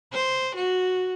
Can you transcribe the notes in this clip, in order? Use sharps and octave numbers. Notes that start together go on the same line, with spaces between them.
C5
F#4